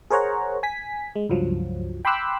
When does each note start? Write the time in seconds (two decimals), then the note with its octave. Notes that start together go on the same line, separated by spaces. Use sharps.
0.11 G#4 A#4 C5 C#5 F#5 A#5
0.63 G#5 B6
1.16 G#3
1.29 C#2 G2 F3 F#3
2.05 G5 B5 C6 D6 E6 F#6